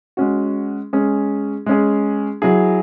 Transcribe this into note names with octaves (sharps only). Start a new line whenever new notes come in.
G#3 C#4 F#4
G#3 C#4 G#4
G#3 C#4 G#4
F#3 E4 G#4